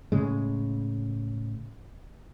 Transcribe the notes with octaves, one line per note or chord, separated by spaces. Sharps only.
A2 C#3 G#3